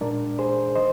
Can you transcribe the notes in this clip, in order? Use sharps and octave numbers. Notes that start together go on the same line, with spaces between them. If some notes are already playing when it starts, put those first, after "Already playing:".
A#2 G#3 D4 A#4 D5
G#4 C5
D#3 C5 D#5